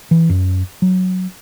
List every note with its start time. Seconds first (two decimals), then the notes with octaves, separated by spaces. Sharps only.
0.11 E3
0.29 F#2
0.82 F#3